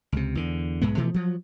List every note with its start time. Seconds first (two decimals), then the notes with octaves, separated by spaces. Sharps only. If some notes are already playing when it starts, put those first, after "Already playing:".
0.12 C#2 C3
0.35 E2 D3
0.82 B1 G#2 G#3 B3
0.97 B2 E3 F3 A3
1.14 F3 F#3